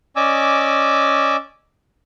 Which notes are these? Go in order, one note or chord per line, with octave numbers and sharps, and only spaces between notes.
C#4 D5 D#5 G#5 D6 E6